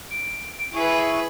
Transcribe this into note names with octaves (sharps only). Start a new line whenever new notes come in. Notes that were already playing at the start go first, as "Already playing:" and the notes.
D7
E4 G#4 B4 C#6